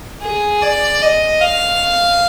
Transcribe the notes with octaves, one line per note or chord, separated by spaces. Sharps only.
G#4
D5
D#5
F5